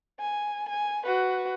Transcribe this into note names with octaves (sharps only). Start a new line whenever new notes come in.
G#5
G#5
F#4 B4